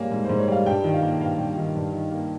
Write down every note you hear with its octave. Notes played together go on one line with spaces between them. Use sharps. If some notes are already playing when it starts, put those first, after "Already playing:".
Already playing: G#2 G3 A#3 C#5 G#5
G#2
G#2 C5
C#5
G3 F5
G2 G5
D#3
F5
A#3
G2 F5
G2
D#3
G2
D#3
A#3